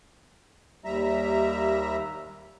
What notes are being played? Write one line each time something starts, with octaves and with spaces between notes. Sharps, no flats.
D#2 G3 E5 A#5